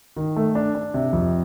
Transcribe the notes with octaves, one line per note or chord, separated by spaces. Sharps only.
D#3
A3
D4
D4
C3
F2